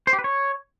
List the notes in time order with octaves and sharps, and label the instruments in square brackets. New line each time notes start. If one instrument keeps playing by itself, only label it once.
[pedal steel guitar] C5
G4
B4
C#5